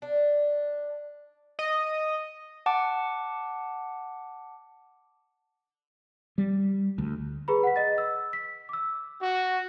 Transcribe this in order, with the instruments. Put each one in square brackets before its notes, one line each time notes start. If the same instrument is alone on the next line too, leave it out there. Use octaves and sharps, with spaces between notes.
[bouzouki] D4
[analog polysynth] D#5
[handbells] F#5 A5 D6
[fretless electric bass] G3
D2
[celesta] G#4 B4 A#5 B5
F#5 B6
D#5 A6
E6
B6
D6 E6
[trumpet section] F#4